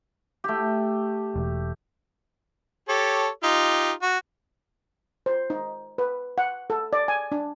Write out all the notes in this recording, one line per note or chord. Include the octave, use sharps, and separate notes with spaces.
A3 G4
E1
G4 A4 C#5
D#4 F4 G4
F#4
C5
D#4
B4
F#5
A4
D5
G#5
D4